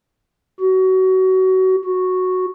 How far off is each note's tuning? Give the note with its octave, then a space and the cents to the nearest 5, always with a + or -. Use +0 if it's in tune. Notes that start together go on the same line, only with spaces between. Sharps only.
F#4 +25
F#4 -5